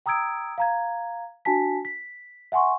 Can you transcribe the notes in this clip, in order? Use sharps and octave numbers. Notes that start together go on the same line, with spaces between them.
G5 A#5 D#6 E6 G#6 D7
F5 A#5 G#6
D4 F#4 G#5 A5 B6
B6
E5 F#5 G#5 C6 C#6